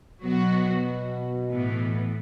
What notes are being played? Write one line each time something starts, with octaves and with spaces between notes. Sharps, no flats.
B2 F#3 B3 F#4
A2 E3 B3